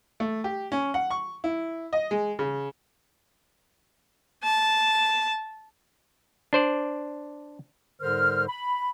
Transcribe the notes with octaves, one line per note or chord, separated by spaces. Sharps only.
A3
G4
C#4
F#5
C#6
E4
D#5
G#3
C#3
A5
D4 C5 D5
G#2 D3 G3 A#4 C5 F6
B5